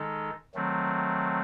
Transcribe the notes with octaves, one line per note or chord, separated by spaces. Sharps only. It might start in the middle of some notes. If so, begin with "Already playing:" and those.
Already playing: D#3 G#3 D#4 A4
D#3 F#3 A3 C4